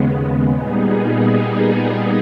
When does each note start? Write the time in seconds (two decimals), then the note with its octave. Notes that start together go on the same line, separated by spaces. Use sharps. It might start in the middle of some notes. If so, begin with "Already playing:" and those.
Already playing: D#2 C#3 G#3 B3
0.52 A#2 G3 B3 D#4 G#4